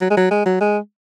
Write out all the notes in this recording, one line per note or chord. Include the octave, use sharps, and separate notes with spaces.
F#3
G#3
F#3
G#3
F#3
G#3